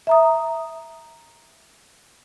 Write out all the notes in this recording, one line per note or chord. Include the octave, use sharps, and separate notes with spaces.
E5 A#5 D#6